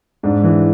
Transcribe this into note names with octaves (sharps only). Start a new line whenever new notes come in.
G#2 D4
E3